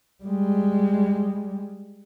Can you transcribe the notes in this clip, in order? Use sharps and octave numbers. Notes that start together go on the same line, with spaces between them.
G3 G#3